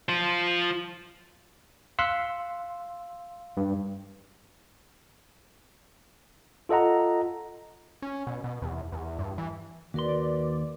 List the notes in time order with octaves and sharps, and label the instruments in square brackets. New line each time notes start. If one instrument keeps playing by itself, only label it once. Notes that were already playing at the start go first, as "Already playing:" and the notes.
[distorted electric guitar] F3 F4
[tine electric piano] F5 C6 E6 F#6 B6 C#7
G2
F4 A4 D#5 F#5 A#5
[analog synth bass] C#4
B2
B2
E2
E2
G2
E3
[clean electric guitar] D#2 C6 [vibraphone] F#4 A#4 B4 [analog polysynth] D5